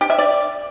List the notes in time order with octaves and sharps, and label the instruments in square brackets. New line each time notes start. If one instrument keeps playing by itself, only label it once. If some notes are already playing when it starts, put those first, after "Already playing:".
[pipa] G4
E5
D5